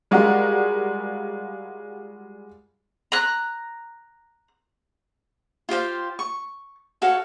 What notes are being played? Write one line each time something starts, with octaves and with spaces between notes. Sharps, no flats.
G3 G#3 F4 F#4 A#4
A#5 F#6
F4 G4 C5 F5
C#6
F#4 A4 C#5 F5